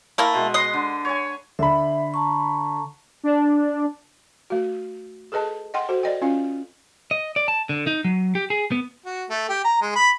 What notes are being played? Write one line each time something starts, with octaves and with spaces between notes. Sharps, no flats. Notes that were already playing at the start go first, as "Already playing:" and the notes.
A3 A#3 E4
B2 G#3
B4 D#5 C6
D3
C#5 G#5
D3 E5 B5
A5 A#5 C#6
D4
A3 F#4
G#4 A4 B4 D#5 A5
D#5 F#5 G5 C6
F#4 A4 C5
D5 D#5 G5
C#4 F4 F5
D#5
D5
A5
D3
D#4
F#3
G4
G#4
B3
F#4
A3
G4
A#5
G#3
B5